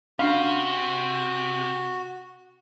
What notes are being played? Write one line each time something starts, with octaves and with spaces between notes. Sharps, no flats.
C3 C#4 D4 F#4 F5